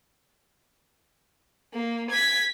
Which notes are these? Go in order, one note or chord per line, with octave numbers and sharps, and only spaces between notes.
A#3
G#6 B6